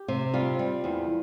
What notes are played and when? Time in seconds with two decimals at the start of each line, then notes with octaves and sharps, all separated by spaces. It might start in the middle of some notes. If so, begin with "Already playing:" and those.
Already playing: G4
0.08 C3
0.34 G3 F4
0.59 G3
0.84 E2